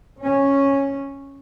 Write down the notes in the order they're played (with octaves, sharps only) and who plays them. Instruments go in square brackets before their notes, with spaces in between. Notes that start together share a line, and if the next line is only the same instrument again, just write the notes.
[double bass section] C#4